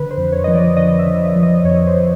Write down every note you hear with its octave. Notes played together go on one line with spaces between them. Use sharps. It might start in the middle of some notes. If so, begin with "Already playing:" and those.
Already playing: D3 B4
C5
F2
C#5
F3 D#5
D5
D3 D#5
E5
D3
F3
D#5
F2 C#5
C5